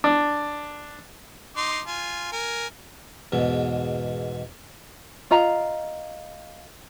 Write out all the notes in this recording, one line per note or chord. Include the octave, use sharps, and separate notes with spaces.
D4
D#4 C6 D6
F4 G#5
A#4 G#5
E2 G#2 B2
F4 D#5 F5 A#5